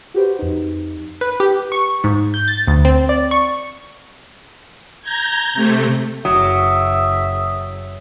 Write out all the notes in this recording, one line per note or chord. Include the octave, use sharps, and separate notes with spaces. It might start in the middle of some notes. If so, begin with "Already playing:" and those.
F#4 G4 B4 C5
F2 D#4
B4
G4
C#6
G#2
G6
A6
D2
C4
D5
C#6
A#5 G6 G#6
C3 A3
F#1 F#3 E5 D#6